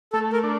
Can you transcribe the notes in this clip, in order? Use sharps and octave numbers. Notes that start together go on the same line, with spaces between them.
A3 A4
A#4
D4